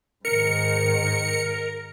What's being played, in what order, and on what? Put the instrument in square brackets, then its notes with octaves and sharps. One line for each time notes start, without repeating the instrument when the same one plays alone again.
[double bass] G#2 D#3 [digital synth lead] A#4 [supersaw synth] C#7